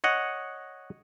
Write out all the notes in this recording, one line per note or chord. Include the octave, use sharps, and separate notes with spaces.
C#5 D#5 F#5